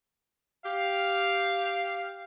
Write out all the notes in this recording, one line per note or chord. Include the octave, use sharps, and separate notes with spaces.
G4 F5